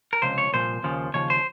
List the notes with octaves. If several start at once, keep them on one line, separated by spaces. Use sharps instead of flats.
A#4
C#2 C3 F3 C5
C#5
C2 A#2 F3 C5
D#2 C#3 F3
D#2 C#3 F3 C#5
C5